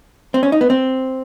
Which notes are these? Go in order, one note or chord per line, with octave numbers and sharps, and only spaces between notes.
C4
C#4
D#4
B3
C4